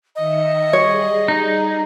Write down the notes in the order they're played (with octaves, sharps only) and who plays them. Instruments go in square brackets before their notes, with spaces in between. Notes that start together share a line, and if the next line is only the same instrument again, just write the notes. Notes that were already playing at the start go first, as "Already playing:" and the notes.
[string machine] D#3 E5 C#7 [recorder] D#5
[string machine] G3 G#4 [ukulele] C#5
[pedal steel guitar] D#4